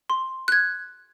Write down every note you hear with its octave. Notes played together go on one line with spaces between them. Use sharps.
C6
F#6 G#6